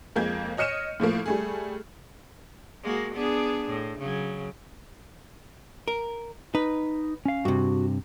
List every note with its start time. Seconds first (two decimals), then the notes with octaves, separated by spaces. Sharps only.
0.16 F2 G#3 A#3 G6 G#6
0.57 C#5 D#5 F6 C#7 D#7 E7
1.00 A2 F3 A3 A#3
1.26 G3 A3 G#4
2.83 G#3 A#3 F#4
3.14 B3 D4 G#4
3.69 A2
3.99 C#3 F#3
5.88 A#4
6.55 D#4 B4
7.25 C#4 F5
7.45 G2 C3 F#4